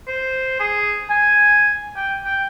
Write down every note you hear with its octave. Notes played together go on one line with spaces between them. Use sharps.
C5
G#4
G#5
G5
G5